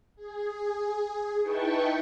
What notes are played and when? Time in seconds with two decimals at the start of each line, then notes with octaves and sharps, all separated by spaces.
0.16 G#4
1.43 D#4 E4 B4 G5 A5 C#6